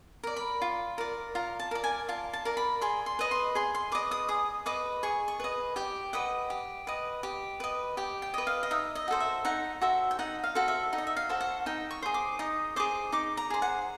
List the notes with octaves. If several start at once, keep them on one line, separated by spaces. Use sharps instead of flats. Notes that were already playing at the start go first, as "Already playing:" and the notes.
A#4 D5
B5
F4
A#4 D5
F4 A#5
A5
A#4 D5
G#5
F4 A5
A5
A#4 D5
B5
G#4 C6
C6
B4 D#5
C6
G#4 C6
C6
B4 D#5 D6
D#6
G#4 D#6
B4 D#5 D6
G#4 C#6
C#6
B4 D#5
G4 G5
B4 D#5 F#5
G4
B4 D#5
G4
B4 D#5
G4 G5
G5
B4 D#5
F5
D#5
D#4 E5
D#5
F#4 A4 C5
E5
D#4 F#5
F#4 A4 C5 E5
G5
D#4 F#5
F5
F#4 A4 C5
E5
D#4
D#5
E5
F5
F#4 A4 C5
F#5
D#4 G5
C#6
G#4 C5
D6
D#4 D#6
G#4 C5 D6
D#4 D6
A#5
G#4 C5
F#5